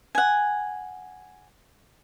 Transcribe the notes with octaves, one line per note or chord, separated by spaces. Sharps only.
F#5 G#5